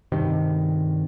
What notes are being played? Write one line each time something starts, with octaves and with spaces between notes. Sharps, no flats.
G2 C3 D#3